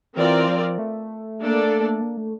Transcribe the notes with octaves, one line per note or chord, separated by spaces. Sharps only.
E3 C4 F4 A#4 D5
F3
A3
A#3 D4 A4 D5
A#3
A3